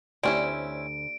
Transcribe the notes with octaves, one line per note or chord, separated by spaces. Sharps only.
D2 C4 C#4 E4 G4 D5 D7